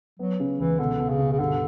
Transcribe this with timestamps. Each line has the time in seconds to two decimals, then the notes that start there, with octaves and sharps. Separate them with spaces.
0.19 F#3 B3
0.40 C#3
0.59 C#2 E3
0.79 B2 D3
0.99 B2
1.09 C#3
1.19 B2
1.32 C#3
1.39 G2 D3